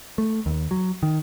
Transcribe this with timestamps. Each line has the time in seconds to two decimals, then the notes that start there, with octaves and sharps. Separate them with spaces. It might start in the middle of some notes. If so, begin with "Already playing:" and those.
0.18 A3
0.46 D#2
0.71 F#3
1.03 D#3